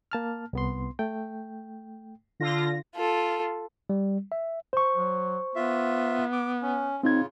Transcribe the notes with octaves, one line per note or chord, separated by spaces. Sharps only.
A#3 A5 F6
C2 B3 C6
A3 G5
D3 F4 A#6
F4 A4
G3
E5
C5 C#6
F#3
B3 F4 E5
D6
C#4
C#3 C4 D#4 F4 G#6